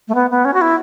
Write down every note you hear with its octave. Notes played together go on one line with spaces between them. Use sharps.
A3
B3
B3
C#4
F#4
E4